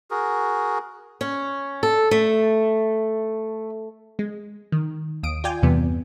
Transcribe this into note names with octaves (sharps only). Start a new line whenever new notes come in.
F#4 G#4 A#4
C#4
A4
A3
G#3
D#3
D#2 D#6 D7
F4 D5 G5 G#5
E2 G2 C3 B3